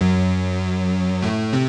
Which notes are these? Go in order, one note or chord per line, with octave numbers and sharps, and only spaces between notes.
F#2 F#3
A2 A3
C3 C4